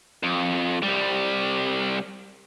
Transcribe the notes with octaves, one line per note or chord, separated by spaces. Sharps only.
F2
C2 G3